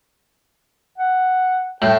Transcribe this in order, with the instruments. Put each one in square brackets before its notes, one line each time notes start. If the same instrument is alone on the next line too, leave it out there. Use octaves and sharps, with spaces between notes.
[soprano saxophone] F#5
[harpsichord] A2 [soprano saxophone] G5